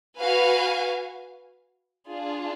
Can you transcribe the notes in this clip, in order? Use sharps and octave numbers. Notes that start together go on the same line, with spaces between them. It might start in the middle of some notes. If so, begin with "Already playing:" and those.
F#4 B4 F5 G#5
D4 F4 G#4